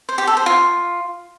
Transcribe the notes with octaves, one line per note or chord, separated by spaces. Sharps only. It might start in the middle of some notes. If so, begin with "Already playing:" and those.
C5
G4
A4
C5
F4